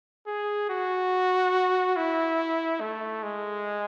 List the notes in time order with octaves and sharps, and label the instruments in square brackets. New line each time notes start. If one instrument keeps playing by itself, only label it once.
[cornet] G#4
F#4
E4
A3
G#3